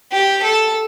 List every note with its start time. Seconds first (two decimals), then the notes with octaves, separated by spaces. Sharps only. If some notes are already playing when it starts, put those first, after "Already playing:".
0.12 G4
0.43 A4